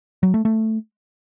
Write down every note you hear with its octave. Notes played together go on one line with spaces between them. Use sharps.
F#3
A3
A3